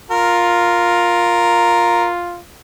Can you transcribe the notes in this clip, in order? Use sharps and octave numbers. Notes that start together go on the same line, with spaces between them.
F4 A#4